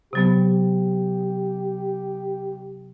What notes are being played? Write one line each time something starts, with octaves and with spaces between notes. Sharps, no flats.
C3 F#3 B3 G4